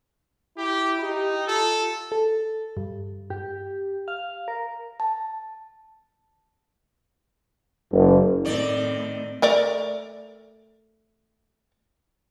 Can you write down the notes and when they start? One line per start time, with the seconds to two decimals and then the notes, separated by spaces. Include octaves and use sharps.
0.57 E4 G4
1.02 D#4 G4
1.48 F4 A4
2.12 A4
2.77 G2
3.30 G4
4.08 F5
4.48 A#4
5.00 A5
7.92 F#1
8.45 A2 D#3 C4 D5
9.42 A3 A#4 D5